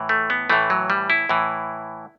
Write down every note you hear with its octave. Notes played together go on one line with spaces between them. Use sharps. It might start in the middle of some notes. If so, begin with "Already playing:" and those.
Already playing: A2 E3
A3
B3
A2 E3 A3
F#3
G3
E4
A2 E3